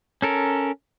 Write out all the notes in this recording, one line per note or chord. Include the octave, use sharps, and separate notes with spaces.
C#4 A4 A#4